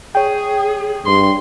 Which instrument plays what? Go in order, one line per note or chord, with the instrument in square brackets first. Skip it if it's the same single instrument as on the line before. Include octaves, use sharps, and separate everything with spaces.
[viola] G#4 [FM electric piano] C#5 G5
[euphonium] G2 [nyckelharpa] C6